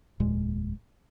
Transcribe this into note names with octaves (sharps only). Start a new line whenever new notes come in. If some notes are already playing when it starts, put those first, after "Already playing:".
F1 D#2 A#2 G#3